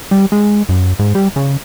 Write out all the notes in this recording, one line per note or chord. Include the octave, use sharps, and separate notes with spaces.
G3
G#3
F#2
G#2
G3
C#3